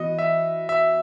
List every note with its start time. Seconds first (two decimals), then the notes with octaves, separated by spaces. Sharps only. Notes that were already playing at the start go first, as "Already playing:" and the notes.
Already playing: E3 B3 F#4 D#5
0.19 E5
0.69 E5